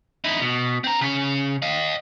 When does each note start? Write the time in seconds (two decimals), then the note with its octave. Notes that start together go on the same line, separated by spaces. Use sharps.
0.24 D#4 E4
0.42 B2
0.84 C4 A#5
1.01 C#3 C#4
1.62 D#5 F5